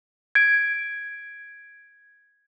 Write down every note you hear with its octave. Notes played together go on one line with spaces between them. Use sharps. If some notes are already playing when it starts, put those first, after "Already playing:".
G#6 D7